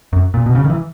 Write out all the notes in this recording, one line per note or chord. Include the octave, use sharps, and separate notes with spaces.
F#2
A#2
B2
C#3
D#3
E3